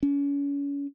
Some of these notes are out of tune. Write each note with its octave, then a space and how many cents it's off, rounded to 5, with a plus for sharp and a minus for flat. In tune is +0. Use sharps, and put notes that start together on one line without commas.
C#4 +35